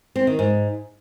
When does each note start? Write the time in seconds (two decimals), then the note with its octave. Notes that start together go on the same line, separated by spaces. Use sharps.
0.16 C4
0.27 D#3
0.39 G#2